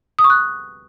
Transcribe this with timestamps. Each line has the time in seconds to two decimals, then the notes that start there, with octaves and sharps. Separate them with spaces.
0.19 D#6
0.24 C#6
0.30 F#6